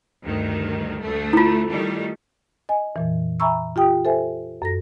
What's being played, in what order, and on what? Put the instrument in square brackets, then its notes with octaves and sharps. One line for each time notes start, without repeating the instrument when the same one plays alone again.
[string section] D2 G2 D#3
D2 A3
[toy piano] E4 F4
[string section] D#3 G3 A3
[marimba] D#5 G#5
F2 A#2 E3
E5 G#5 A#5 B5 C#6 E6
F4 G4 G5 D#6
A4 C5 E5 G#5
F#2 A4 A#6